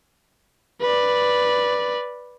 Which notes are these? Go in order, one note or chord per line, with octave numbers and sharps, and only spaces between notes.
B4 D5